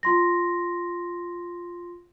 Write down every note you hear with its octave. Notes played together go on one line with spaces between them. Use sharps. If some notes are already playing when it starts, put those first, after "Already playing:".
F4 C6 A#6